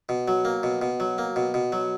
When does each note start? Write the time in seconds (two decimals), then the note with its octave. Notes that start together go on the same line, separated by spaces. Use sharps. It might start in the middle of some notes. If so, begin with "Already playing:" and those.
0.09 B2
0.28 F#3
0.45 A#3
0.63 B2
0.82 B2
1.00 F#3
1.18 A#3
1.36 B2
1.54 B2
1.72 F#3